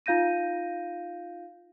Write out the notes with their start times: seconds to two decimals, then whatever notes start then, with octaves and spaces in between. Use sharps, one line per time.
0.06 D#4 F4 F5 G6 A#6 D#7